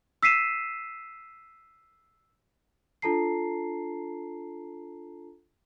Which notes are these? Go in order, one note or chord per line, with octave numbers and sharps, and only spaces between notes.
E6 B6 C7 D#7 E7
D4 F4 A4 A5 A#5 C7